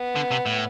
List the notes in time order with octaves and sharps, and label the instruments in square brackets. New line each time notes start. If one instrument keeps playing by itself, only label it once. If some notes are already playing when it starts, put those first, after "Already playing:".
Already playing: [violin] B3
[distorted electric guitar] D3
C3
A2